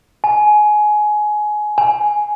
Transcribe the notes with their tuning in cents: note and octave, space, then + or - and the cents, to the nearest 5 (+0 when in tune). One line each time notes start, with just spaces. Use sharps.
G#5 +20
G#5 +5